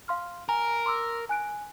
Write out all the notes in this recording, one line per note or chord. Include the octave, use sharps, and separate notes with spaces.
F5 C6 F6
A#4 G#5
C6 D6 E6
G#5 F#6 D7